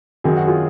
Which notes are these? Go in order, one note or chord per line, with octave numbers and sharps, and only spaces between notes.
F#2 D#3 F#3 G#4
F#4
F4 G#4